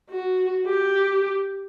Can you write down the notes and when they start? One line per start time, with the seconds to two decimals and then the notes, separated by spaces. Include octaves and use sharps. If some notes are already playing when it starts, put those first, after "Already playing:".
0.10 F#4
0.66 G4